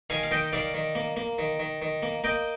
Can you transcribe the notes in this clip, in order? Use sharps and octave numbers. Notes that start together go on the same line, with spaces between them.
D#3 F5 G#5
F5
D#3 D#5 G5
D#3 D5 F5
D#3
A#3
A#3
D#3
D#3
D#3
A#3
A#3 D#5 G5